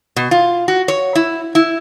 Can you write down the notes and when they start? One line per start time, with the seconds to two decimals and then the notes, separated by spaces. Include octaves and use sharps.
0.16 B2
0.31 F4
0.68 F#4
0.88 C#5
1.15 E4
1.55 E4